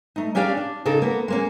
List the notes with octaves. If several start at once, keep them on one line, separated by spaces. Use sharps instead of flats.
A3 D#4
A#3 C#4 D4 G4 D5 F5
D4
C#3 D#4 A4 A#4
A#3 B3
G#3 A#3 C#4